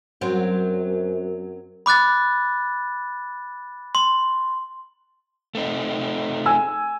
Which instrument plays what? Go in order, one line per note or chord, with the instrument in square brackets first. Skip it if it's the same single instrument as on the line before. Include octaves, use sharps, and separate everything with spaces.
[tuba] F#2 [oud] F#3 C4
[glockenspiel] B5 D6 F#6 A6
C6
[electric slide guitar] A3 C4 D#4
[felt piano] G#5 E6